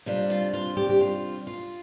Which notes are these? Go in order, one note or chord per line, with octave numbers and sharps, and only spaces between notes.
C3 G3 D4 F4
F4
F4
G4
G4
F4
F4